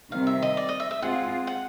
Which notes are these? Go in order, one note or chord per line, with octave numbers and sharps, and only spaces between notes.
C3 D#3 G3 C4 F5
E5
D#5
D5
D#5
E5
E5
G#3 C4 F4 G#4 F#5
F#5